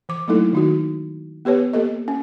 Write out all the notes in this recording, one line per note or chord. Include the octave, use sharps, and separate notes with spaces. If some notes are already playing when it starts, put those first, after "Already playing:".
E3 D6
F#3 A3 A#3 D#4 E4 A4
D#3 D#4 F#4
B3 G4 B4 C#5
A#3 G4 A4 D#5
C#4